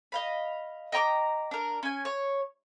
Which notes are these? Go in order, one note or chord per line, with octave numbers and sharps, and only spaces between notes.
D#5 F5 B5
D#5 G5 A#5 D6
D4 A#4
C#4 G#5
C#5